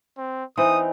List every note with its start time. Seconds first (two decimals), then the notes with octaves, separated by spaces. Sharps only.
0.18 C4
0.57 E3 C4 D#4 D#6